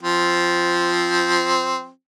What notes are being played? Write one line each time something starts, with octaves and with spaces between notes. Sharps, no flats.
F3 C4